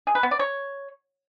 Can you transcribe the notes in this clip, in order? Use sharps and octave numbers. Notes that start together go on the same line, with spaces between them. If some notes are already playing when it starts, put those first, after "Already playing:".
G#4
B4
B3
D5
C#5